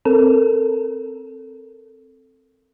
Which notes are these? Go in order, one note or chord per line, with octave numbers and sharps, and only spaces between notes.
C4 A4 A#4